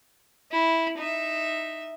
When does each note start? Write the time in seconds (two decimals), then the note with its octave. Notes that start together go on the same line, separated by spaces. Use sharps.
0.52 E4
0.98 D#4 E5